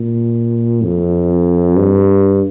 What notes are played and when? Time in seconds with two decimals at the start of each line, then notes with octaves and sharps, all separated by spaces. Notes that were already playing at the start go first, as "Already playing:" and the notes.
Already playing: A#2
0.83 F2
1.76 G2